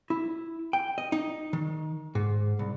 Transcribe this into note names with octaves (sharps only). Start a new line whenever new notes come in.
E4
G5
D#5
D#4
D#3
G#2
C2